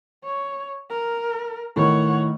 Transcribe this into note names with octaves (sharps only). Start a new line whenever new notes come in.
C#5
A#4
A2 D#3 C#5 F#5